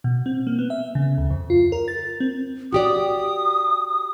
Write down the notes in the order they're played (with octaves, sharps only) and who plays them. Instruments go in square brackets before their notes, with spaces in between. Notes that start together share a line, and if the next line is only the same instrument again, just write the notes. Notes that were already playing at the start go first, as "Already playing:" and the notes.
[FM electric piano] B2
C4
A#3
B3
E5
C#3
D2
F2
F4
A#4
A6
C4
[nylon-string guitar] F#4 G4 D5 [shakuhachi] D#6